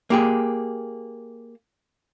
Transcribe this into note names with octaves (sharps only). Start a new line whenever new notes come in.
A#3 G4 G#4